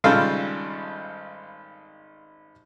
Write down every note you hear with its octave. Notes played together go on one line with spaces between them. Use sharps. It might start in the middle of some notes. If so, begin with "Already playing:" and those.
G#1 C#3 G3 F4 A4 F5